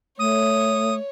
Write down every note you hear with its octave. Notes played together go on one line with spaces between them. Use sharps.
A3 C#5 D#6